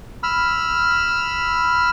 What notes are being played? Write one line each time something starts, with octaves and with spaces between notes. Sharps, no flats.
B5 E6 F6